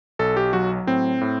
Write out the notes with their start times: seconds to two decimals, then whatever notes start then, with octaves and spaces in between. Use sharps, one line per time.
0.19 B1 A4
0.37 G4
0.53 F#3 F#4
0.87 A2 C4
1.21 A2